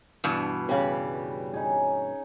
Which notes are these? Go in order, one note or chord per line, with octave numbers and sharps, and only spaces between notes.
G2 B2 E3
C#3 G3
C#4 D#4 G#4